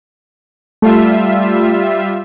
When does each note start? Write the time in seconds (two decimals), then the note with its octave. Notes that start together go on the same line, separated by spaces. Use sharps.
0.82 G3 A3 F4 E5